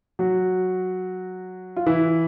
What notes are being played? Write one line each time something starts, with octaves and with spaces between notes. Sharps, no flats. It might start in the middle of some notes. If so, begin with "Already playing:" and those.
F#3 F#4
F4
E3 E4